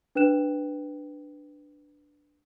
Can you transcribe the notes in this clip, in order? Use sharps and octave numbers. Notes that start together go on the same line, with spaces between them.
D4 B4 G5 F#6 E7